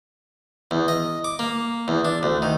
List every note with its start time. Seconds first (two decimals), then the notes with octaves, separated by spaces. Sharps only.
0.71 E2
0.88 D#5
1.24 D6
1.39 A#3
1.88 E2
2.05 D4
2.23 D2
2.42 D#3